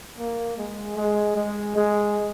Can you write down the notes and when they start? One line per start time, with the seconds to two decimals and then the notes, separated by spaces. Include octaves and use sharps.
0.18 A#3
0.57 G#3
0.97 G#3
1.36 G#3
1.76 G#3